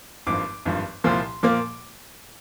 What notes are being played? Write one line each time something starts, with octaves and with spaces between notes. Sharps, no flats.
G#1 G2 F3 D6
G#1 G2 F3
C2 A#2 F3 A#3 C6
A#2 F3 A#3 D6